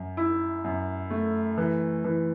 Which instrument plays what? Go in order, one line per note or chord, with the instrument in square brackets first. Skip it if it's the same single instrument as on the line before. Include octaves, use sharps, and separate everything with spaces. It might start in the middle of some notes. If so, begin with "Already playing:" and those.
Already playing: [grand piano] F#2
E4
F#2
A3
E3
E3